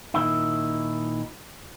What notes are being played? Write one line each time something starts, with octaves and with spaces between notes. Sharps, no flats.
A#2 D#3 D#4 E4